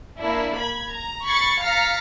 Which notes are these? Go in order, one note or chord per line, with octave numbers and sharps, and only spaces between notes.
A#3 D4 E4
B5 G#6
A#5
B5 C#6 G#6 A6 C7 C#7
F5 A#5 F6 A6 B6 C#7